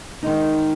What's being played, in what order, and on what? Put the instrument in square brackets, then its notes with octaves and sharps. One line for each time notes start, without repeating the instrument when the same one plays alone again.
[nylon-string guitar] D#3 G#3 D#4